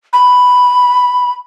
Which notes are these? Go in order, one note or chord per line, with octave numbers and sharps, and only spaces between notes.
B5